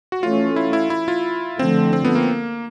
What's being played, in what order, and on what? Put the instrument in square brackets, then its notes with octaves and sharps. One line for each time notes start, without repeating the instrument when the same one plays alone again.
[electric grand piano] F#4
[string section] E3 A3 C#4 [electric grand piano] F4
[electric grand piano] E4
E4
E4
F4
[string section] D3 F3 A3 [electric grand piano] C4
[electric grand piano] C4
B3
A#3